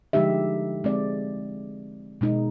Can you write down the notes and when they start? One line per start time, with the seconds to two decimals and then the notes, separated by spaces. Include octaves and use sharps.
0.13 D3 F3 G#3 D#4 G4 E5
0.84 G#3 C4 D5
2.21 B2 G#3 D#4